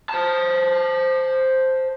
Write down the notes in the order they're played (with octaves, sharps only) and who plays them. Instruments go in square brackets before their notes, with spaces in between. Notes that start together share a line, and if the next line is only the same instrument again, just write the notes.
[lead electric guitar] C5 A5